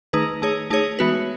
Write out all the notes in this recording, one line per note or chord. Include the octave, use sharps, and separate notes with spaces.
D#3 A3 D#4 G#4 B4
A3 D#4 G#4 C#5
A3 D#4 G#4 C#5
E3 G#3 B3 F#4 B4